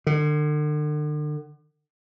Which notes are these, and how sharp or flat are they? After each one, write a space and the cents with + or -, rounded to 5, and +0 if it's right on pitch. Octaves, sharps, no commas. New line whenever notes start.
D3 +40